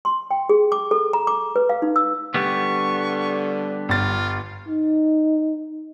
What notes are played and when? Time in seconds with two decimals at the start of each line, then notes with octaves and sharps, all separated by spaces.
0.05 C6
0.31 G5
0.49 G#4
0.72 D6
0.91 A4
1.13 A#5
1.27 D6
1.56 B4
1.69 F5
1.82 D#4
1.96 E6
2.34 D3 G3 B3 C#6
3.89 G1 F4 A6
4.69 D#4